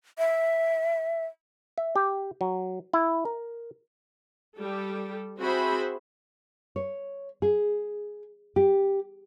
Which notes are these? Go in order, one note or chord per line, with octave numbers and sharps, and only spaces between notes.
E5
E5
G4
F#3
E4
A#4
G3 G4 A4
C4 F#4 G#4 C5 E5 B5
C#5
G#4
G4